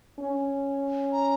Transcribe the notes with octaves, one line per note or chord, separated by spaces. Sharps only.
C#4
A#5